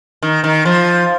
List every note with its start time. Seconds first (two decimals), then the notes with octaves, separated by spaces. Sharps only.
0.23 D#3
0.44 D#3
0.65 F3